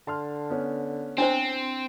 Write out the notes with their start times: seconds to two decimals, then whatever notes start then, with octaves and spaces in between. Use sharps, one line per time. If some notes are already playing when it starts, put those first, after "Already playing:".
0.07 D3 A5 C6 F6
0.50 B3 C#4
1.18 C4 D4 E4 C5